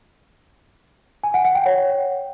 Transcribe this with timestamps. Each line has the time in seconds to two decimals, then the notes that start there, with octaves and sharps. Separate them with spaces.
1.24 G#5
1.34 F#5
1.45 F#5
1.55 G5
1.66 C#5